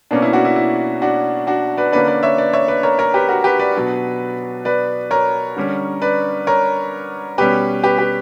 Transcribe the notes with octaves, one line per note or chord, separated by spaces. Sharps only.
B2 A#3 C#4 D4
E4
D4 F#4
E4
E4
D4 F#4
D4 F#4
B4 D5
D3 A#3 C#4 B4 D5
B4 D5
C#5 E5
B4 D5
C#5 E5
B4 D5
A#4 C#5
A#4 C#5
G4 B4
F#4 A#4
G4 B4
B4 D5
B2 F#3 B3 D4
B4 D5
A#4 C#5
D3 G3 C#4
B4 D5
A#4 C#5
B2 G3 C#4 G4 B4
G4 B4
G4 B4